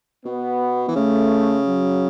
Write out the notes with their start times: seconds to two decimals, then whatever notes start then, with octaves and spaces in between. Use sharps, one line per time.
0.25 B2 B3
0.88 E3
0.96 C#3 A3
1.66 F#3